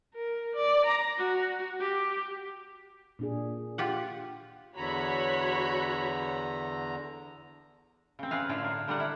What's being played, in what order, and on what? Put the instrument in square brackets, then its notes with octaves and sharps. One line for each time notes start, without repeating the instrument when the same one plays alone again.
[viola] A#4
D5
A#5
F#4
G4
[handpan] A#2 D4 G#4
[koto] F4 G4 F#5
[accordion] E2 D3 A#5 [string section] F#4 C#5 B5
[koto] C#3 C4
C#3 G#4 B4 F5
A2 D3 E4 F4
A#4
D3 G3 F4 A#4 F#5
E4